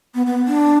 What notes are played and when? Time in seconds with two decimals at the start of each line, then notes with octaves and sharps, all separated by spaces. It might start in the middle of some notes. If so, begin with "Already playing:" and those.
0.15 B3
0.26 B3
0.48 D4